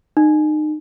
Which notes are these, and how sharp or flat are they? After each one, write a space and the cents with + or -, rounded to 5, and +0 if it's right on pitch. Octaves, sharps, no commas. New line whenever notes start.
D#4 -30